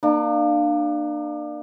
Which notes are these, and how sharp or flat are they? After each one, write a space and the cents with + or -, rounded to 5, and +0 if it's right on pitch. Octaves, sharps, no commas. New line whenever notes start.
A#3 +0 D4 +35